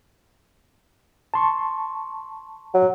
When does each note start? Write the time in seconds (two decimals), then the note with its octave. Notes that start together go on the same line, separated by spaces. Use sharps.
1.34 A5 C6 C#6
2.74 F#3